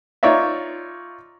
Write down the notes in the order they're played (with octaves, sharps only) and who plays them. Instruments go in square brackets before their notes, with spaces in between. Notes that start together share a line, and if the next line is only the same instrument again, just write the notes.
[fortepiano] D#4 F4 C#5 D5 E5